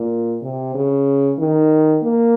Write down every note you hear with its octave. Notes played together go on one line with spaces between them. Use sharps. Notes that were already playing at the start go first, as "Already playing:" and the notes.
Already playing: A#2
C3
C#3
D#3
A#3